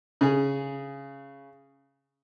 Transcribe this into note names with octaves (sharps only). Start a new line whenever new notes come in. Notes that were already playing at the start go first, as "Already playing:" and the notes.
C#3 G#4